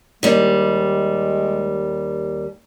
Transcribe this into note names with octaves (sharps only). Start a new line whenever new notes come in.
D#2 G3 G#3